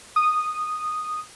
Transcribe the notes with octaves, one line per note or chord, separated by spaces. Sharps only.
D#6